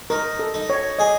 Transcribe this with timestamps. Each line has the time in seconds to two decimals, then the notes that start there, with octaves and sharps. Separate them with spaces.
0.10 D#4 A#4
0.39 A4
0.54 D#4
0.70 C#5
0.99 G#4 D#5